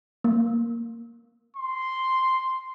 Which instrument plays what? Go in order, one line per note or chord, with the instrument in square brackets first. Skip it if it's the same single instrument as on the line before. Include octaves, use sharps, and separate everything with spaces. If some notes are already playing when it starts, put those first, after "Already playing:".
[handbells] A#3
[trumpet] C6